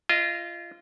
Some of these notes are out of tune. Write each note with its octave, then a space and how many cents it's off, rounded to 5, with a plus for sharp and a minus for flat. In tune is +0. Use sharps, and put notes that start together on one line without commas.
F4 -25 D#5 +0